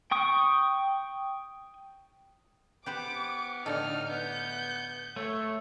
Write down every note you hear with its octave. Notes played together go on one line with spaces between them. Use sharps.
G5 C#6 D#6
B3 G4 B4 C5 D6
A2 D3 D#4 A4 F6
B3 G6
A3 C#5